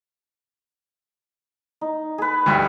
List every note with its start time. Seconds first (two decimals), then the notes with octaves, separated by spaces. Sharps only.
1.81 D#4
2.18 G#4 B4
2.46 D2 G2